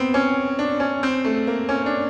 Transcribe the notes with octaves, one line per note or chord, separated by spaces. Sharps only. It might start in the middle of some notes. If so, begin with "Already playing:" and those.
Already playing: B3 C4
C#4
D4
C#4
C4
A3
A#3
C#4
D4